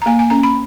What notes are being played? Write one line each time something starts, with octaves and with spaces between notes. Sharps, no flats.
A#5
A#3 G#5
G#5
C#4 A#5
B5